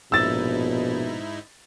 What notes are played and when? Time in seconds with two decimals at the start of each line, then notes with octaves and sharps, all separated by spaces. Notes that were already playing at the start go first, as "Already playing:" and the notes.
0.12 A#1 G#2 B2 D#4 E4 E6 A6